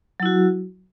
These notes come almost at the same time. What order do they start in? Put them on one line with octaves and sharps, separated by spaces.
F#3 E4 F#4